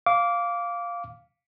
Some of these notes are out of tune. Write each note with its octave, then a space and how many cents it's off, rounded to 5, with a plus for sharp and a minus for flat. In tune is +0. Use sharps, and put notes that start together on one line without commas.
F5 +0 D6 -20